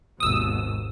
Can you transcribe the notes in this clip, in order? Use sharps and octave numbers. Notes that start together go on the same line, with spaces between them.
G#1 D#2 B2 D#6 E6